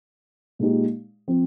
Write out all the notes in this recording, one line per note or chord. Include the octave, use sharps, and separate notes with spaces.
A#2 G#3 D#4 G4
F3 C4